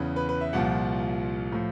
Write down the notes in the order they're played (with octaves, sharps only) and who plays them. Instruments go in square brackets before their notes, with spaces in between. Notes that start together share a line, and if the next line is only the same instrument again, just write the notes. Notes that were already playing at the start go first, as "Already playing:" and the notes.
Already playing: [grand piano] E2 C#3 E3
B4
B4
E5
C2 A#2 F3 F#5
A2 F3